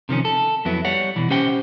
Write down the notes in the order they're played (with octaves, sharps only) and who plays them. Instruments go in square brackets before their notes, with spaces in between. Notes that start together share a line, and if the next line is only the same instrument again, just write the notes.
[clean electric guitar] C3 D#3 F3 C#4
A4
F2 F#3 B3 E4
G3 C#5 F#5
B2 D#3 E3
C#4 G4 C5 F#5 G5